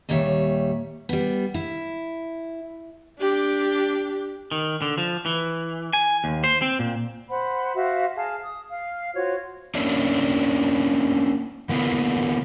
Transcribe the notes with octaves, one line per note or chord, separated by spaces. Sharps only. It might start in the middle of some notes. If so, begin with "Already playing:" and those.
D#2 A#2 G3 C#5 E5
G3 B3
E4
D4 G4
D#3
D3
F3
E3
G#5
D#2
C5
C4
A#2
C5 F#5 B5
F#4 C5 E5 F5
G#4 F5 A5
D#6
F5
F4 F#4 C5 C#5
A#3 C#4 D4 E4
D3 A#3 B3 E4